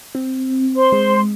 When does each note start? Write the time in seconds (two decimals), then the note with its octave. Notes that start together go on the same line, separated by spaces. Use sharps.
0.15 C4
0.76 C5 C6
0.92 G#3